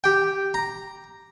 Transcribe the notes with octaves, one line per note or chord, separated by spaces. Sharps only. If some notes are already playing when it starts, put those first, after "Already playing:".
G4 G5
A#5